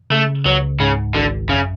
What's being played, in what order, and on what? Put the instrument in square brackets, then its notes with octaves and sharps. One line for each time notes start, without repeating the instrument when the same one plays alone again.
[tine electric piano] C#3 [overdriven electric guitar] A3
[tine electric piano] C#2 [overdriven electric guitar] F#3
[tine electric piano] G#2 [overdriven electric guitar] C#3
[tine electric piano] G#1 [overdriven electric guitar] D3
[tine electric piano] F#2 [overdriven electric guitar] C#3